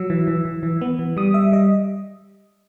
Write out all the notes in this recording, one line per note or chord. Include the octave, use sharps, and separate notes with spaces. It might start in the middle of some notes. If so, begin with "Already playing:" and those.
Already playing: F#3 E6
E3
E3
E3
E3
B3
E3
G3 D#6
G3 E5
G3 D#5